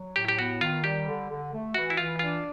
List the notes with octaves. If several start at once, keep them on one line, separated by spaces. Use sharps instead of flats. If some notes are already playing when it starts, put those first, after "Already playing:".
Already playing: F#3
A2 G4
G4
B3 F#4
D#3 F4
G3 G4
D3
D3
A3
E3 F#4
E4
E3 F4
D4 F4